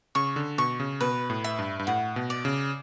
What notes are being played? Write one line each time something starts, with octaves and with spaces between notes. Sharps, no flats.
C#3 C#6
D3
B2 C#6
C#3
B2 B4
A2
E5
G2
G2
A2 F#5
B2
D5
C#3